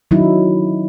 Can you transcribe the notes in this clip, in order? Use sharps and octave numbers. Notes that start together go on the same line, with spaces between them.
D#3 F#3 C#4 D#4 E4